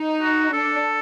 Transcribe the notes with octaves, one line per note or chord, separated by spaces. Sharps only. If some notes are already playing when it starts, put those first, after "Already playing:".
Already playing: D#4
F#4
D4 A4